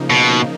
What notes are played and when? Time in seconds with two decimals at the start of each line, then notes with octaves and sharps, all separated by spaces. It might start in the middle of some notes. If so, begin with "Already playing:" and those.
Already playing: C#3 F3 A#3 D#4
0.10 B2